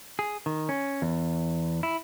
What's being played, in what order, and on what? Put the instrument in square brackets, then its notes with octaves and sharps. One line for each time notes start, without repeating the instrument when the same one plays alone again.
[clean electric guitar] G#4
D#3
C#4
E2
E4